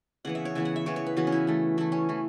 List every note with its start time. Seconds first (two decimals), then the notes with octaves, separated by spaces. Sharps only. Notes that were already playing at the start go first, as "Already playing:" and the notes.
0.25 C#3 E3 B3 F#5
0.35 E5
0.45 C#5
0.55 C#3 E3 B3 E5
0.65 F#5
0.76 E5
0.86 C#3 E3 B3 C#5
0.96 C#5
1.06 B4
1.17 C#3 E3 B3 F#4
1.27 C#4
1.32 E4
1.47 E3 A3
1.78 E3 A3 E4
1.92 C#4
2.09 E3 A3